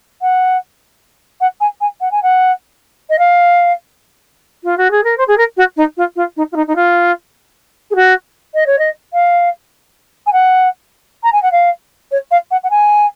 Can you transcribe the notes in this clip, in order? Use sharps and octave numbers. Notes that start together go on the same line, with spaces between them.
F#5
F#5
G#5
G#5
F#5
G#5
F#5
D#5
F5
F4
F#4
G#4
A#4
C5
G#4
A#4
F#4
D#4
F4
F4
D#4
F4
D#4
D#4
F4
G#4
F#4
D#5
C#5
D#5
F5
G#5
F#5
A#5
G#5
F#5
F5
C#5
F5
F#5
F#5
G#5